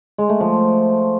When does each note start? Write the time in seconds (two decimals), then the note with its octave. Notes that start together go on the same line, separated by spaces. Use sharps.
0.18 G#3
0.29 A3
0.40 F3